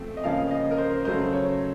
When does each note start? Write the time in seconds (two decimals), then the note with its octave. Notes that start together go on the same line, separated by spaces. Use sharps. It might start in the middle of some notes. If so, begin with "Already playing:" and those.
Already playing: F3 A3 C4
0.17 D#5
0.24 C#3 F3 A#3 C#4 F5
0.51 D#5
0.71 A#4
0.78 C5
1.05 C#3 F#3 A3 C5
1.33 C#5